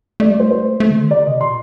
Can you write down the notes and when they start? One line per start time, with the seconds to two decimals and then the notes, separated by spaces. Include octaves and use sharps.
0.20 A3 D5
0.30 G3 D5
0.40 A3 C5
0.51 C5
0.80 A3
0.91 D3
1.01 D#3
1.11 D3 D5
1.26 C3 D#5
1.41 A#2 C6